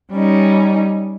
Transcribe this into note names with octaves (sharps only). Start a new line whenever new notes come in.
G3 C#4 D#4